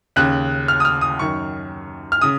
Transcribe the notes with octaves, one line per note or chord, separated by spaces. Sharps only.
D#2 C#3 F#6
F6
D#6
F6
D#6
F#2 D#3 C#6
F6
C#3 D#6